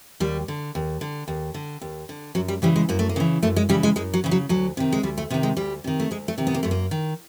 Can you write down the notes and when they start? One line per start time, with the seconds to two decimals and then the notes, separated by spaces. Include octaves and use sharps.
0.20 D#2 G3
0.48 D3
0.75 D#2
1.01 D3
1.28 D#2
1.54 D3
1.81 D#2
2.09 D3
2.35 F#2 F#3
2.48 G3
2.62 C#3 E3 G3
2.76 G#3
2.89 F#2 A#3
2.99 A3
3.09 A#3
3.16 C#3 E3
3.43 F#2 A3
3.56 G#3
3.69 C#3 E3 G3
3.83 G#3
3.96 F#2 G#3
4.14 F#3
4.24 C#3 E3
4.31 F#3
4.49 D2 F#3
4.77 C3 D#3
4.92 G#3
5.03 D2 G3
5.17 A3
5.30 C3 B3
5.34 D#3
5.43 G#3
5.57 D2 G3
5.84 C3 D#3
6.00 A3
6.11 D2 G#3
6.28 A3
6.38 C3 D#3
6.47 B3
6.54 A#3
6.63 F#2 A3
6.71 A#3
6.91 D#3